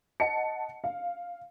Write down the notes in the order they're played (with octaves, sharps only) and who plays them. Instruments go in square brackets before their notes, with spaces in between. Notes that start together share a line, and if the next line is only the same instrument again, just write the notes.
[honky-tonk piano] D#5 F#5 A5 C#7
F5